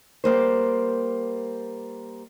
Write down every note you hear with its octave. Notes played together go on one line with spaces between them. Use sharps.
G3 A#3 C5